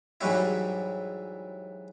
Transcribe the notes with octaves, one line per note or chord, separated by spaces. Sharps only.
G#2 E3 F#3 G3 E4